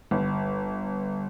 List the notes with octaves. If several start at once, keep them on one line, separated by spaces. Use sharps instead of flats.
G1